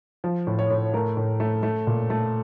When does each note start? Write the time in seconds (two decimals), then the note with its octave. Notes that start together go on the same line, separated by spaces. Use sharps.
0.24 F3
0.47 A2
0.59 C#5
0.70 A2
0.94 A3 A#4
1.17 A2
1.40 A3
1.63 A3
1.87 A#2
2.10 A3